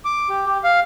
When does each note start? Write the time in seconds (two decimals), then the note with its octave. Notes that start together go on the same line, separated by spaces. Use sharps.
0.05 D6
0.29 G4
0.46 G4
0.64 F5